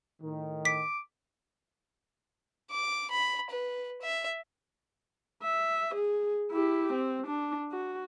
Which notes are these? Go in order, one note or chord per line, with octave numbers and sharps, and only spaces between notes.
A2 D#3
D6 B6
D6
B5
B4
E5
E5
G#4
E4 G4
C4
D4
F#4